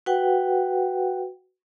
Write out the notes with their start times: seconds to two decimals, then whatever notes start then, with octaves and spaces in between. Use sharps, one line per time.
0.06 F#4 B4 F#5 G5